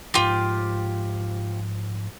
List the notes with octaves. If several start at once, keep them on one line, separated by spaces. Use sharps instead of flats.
G#2 F3 F4 G4